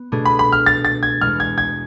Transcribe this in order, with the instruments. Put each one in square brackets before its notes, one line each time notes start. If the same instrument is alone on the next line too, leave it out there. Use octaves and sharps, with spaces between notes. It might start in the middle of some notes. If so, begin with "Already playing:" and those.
Already playing: [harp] B3
B2 A3 D4 G#4
[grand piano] B5
B5
F6
A6
A6
G#6
[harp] E2 B2 G#3 [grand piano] F6
[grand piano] G#6
G#6